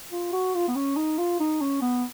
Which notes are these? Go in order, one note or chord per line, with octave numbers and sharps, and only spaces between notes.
F4
F#4
F4
B3
C#4
D#4
F4
D#4
C#4
B3